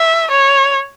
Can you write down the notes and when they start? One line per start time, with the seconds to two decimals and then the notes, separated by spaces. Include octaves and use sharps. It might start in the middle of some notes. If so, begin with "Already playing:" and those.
Already playing: E5
0.31 C#5